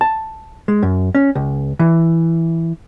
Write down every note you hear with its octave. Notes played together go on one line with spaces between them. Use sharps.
A5
G#3
F#2
C#4
C#2
E3